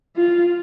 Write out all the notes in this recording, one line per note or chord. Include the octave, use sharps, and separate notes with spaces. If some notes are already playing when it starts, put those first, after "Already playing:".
F4